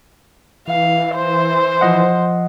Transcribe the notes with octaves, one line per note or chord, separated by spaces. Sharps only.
E3 F5
C5
F3 D#5 F#5